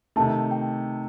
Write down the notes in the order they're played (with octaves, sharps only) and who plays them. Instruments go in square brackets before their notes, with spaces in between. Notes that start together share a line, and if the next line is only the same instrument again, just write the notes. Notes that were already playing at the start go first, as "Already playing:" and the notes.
[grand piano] C3 D#3 A3 [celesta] A5
[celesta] G5